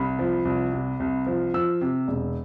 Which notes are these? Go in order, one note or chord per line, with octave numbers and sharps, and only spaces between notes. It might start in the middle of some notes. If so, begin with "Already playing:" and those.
Already playing: C2 B5
F3
C2
C3
C2
F3
F3 E6
C3
E1